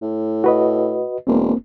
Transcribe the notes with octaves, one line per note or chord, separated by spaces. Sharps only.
A2
F#4 B4 D#5
E1 A#3 C4